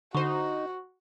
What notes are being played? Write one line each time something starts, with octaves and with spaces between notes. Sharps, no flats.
D3 D#4 F#4 C5 C#6